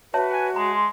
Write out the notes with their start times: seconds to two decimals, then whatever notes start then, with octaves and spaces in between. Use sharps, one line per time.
0.14 F#4 B4 C#5 E5 A5
0.33 G#5
0.56 G#3 A#5
0.71 C6